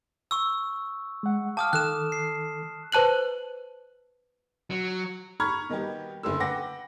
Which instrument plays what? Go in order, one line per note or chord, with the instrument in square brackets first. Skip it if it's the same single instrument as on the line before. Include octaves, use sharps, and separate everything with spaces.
[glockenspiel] C#6 E6
[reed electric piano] G#3 F#5
[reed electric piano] F5 G5 D6 [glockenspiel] A5 D#6 F6
[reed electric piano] D#3 A4 D6 [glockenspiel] F#6 E7
[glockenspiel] C7
[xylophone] B4 C5 A5 F#6 F#7
[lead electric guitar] F#3
[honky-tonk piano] A#5 B5 C#6 F6 G#6
B2 D#3 G3 B3 G4
F#1 A2 D3 E6
B4 F#5 G5 D6 A#6